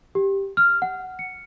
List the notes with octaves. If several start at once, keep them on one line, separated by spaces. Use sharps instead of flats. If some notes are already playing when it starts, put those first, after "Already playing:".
G4
F6
F#5
C#7